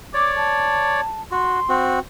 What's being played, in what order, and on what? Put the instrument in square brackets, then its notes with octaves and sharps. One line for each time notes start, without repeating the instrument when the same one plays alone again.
[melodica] C#5 D5 [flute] D6
[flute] A5
[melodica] F#4 [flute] C6
[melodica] C4 F#4